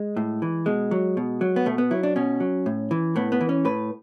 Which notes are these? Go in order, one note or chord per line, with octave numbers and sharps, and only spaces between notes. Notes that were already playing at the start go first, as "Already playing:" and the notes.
Already playing: G#3
A2
E3
B2 G#3
F#3
B2
F#3
B3
B2 A3
B3
F#3 E4
D4
B2 C#4
F#3
A2
E3
A2 B3
B3
E3
C#4
A2 B4